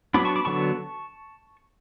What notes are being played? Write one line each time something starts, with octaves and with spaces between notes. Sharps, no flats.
F#3 B3 D4 B5 D6
A5 C#6
B5 D6
D3 F#3 B3 D4 A5 C#6